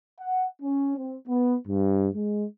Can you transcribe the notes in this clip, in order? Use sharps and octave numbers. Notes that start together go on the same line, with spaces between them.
F#5
C#4
C4
B3
G2
G#3